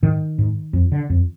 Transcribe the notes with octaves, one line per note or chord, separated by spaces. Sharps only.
G#2 D#3
G#2
F2
D3
F2